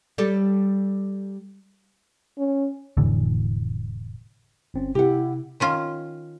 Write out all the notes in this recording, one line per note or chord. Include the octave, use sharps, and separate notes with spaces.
G3 A4
C#4
F1 A2 D3 E3
G1 C4 C#4
C3 E4 G4 F#5
D#3 C#4 F4